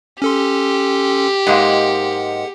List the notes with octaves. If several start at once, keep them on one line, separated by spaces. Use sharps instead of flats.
C#4 G4 A4 C6
G#2 G#3 A#3 F#5